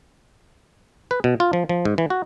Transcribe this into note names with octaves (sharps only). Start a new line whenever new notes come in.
B4
B2
F4
F3
F3
G#2
E3
F#4